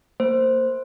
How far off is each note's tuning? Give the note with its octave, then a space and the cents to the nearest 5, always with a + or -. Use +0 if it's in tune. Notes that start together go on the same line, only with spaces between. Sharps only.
A#3 -20 C5 +0